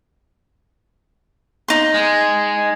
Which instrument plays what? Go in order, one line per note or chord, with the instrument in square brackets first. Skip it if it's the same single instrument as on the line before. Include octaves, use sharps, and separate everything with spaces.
[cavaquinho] D#4 C6
[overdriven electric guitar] G#3